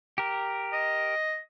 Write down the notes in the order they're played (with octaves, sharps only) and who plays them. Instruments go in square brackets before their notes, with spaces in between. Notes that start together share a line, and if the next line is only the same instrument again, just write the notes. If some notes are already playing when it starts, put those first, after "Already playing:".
[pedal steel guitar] G4 A#4
[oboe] D#5